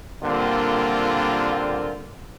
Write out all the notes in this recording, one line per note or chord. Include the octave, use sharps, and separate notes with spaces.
A#2 D3 G3 A#3 C4 F4